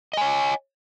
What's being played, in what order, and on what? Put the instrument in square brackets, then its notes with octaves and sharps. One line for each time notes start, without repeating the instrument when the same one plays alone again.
[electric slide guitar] D#5
G#5
C#5